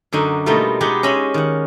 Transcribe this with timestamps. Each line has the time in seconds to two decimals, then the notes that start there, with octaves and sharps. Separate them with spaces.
0.12 F#2 D3 D#4 F#4
0.46 B2 G3 A3 A#3 D#4 F4
0.81 G#3 B3 D#4 G4 F#5
1.03 C#4 D#5 E5 B5 C6
1.34 D#3 F#5